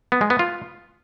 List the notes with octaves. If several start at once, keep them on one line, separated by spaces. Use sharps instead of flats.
B3
G#3
B3
F4